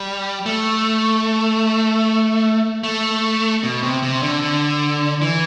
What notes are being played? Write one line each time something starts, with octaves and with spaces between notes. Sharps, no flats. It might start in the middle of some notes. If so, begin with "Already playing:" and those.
Already playing: G3
A3
A3
B2
C3
C3
D3
D3
E3